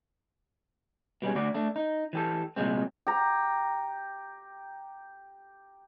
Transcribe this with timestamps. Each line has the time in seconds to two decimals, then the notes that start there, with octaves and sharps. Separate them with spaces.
1.22 B2 G3 G#3 C#4
1.35 D2 F#4 D5
1.54 A3 D4
1.76 D#4
2.13 E3 G4 A4
2.56 C2 A#2 F#3 G#3 C4
3.07 G4 A#5